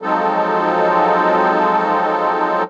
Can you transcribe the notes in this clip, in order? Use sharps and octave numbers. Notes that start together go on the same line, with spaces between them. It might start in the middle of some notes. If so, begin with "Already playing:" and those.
F3 F#3 G#3 C4 D#4 A4